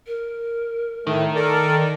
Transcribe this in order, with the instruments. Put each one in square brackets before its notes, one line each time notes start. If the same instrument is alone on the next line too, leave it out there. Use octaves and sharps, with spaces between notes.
[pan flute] A#4
[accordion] A2 A3 [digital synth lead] D#3
[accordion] A4 A#4 D5